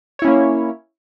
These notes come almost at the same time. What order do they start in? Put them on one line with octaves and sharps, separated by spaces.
C#5 E4 C#4 A#3